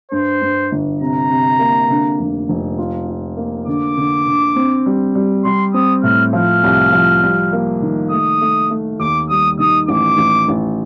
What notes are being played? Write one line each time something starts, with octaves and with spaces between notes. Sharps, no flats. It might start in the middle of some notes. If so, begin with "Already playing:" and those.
G2 C5
G2
G1
C3 A#5
C3
A#3
D3
F1
F1
F4
F4
A#3
D3 D6
D3
D3
C4
G3
G3
G3 C6
C4 D#6
A2 F6
F3 F6
C2
F3
G3
A#3
D#3
A3 D#6
A3
A3
D#2 D6
G3 D#6
D#3 D#6
A1 D6
A1
A1